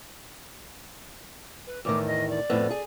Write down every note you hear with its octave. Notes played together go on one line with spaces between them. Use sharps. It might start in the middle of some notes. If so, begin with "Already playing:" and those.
B4
E2 A2 D#3 D6
D#5
D5
F2 A2 B3
G#4